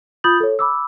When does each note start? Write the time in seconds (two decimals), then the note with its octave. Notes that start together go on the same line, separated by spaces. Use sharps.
0.24 F4 B5 D#6 G6 A6 F#7
0.40 A4 C#5
0.59 B5 D6 E6